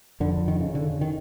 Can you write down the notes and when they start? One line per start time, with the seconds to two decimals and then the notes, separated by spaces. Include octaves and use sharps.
0.20 F2 D3
0.48 D#3
0.60 C#3
0.75 D3
1.01 D#3